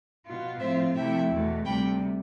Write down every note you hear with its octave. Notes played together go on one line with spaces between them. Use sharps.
B2 B3 F4
A2 F3 C4 F4 C5 E5
C3 F3 A3 E4 E5 G5
E2 B2 A3
D2 C3 G3 G5 B5